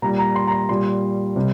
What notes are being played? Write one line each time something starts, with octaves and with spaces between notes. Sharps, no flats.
A#2 G3 A#5
A#5
C6
A#5
C6
A#2 G3 C6
C3 G3